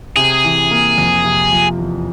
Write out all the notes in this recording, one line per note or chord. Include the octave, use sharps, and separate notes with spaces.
C3 G#4
E3
A#3
F2
C3
F3
E2